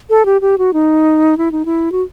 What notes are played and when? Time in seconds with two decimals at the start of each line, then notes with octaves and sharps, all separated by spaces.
0.10 A4
0.25 G4
0.41 G4
0.58 F#4
0.73 D#4
1.38 E4
1.52 D#4
1.65 E4
1.92 F#4